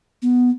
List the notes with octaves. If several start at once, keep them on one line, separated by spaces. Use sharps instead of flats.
B3